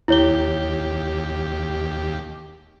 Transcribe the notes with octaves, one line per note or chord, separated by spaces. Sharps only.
D#2 E4 G4 C#5 G7